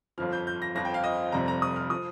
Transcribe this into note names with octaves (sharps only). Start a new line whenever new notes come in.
G1 F2 F3 F6
G6
G6
A#6
G1 F2 F3 A#6
G5
F5
D#5
F1 F2 C3 G3 A#5
A#5
D#6
F6
F3 D#6